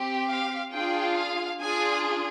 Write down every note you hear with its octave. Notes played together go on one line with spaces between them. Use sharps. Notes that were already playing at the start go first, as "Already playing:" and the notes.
Already playing: C4 G4
F5
D4 F4 G#4 G5
F5
D4 F4 G#4 G#5